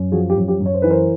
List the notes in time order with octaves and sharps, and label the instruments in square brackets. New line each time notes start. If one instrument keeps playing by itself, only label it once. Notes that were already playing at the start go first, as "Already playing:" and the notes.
Already playing: [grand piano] F#2
F3 F#4 G#4
G4
F#2
G4
F#2
C#5
C5
E3 B4
A#4 C5